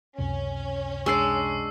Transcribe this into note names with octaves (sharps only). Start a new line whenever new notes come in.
C#2 F#2 C3 C#4
G#3 D4 D5 C#6 E6 C7